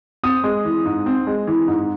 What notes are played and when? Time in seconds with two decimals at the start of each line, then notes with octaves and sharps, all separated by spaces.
0.23 C4 D#6
0.44 G#3
0.65 E3
0.85 G#2
1.06 C4
1.27 G#3
1.47 E3
1.68 G#2